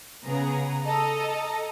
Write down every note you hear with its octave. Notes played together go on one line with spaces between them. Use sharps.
C#3 B3 G#4 A#5
A4 D#5 A#5